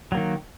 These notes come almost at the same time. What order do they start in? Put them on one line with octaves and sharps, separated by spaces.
F#3 A#3 D#3